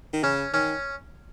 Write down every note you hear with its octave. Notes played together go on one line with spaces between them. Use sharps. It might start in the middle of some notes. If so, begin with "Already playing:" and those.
D#3
C#3 C#4
D#3 C#4